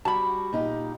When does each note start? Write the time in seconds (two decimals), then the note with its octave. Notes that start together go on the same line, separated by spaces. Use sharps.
0.05 G3 F#4 A5 B5
0.53 A#2 D#4 G4